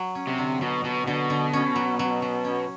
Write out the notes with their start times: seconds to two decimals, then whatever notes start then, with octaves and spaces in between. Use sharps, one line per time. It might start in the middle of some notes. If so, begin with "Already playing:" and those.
Already playing: F#3
0.15 C#4
0.27 C3
0.38 D3
0.61 B2 F#3
0.84 B2 F#3
1.07 B2 D3
1.30 D3
1.53 C#4
1.76 F#3
1.99 F#3
2.22 F#3
2.44 C#4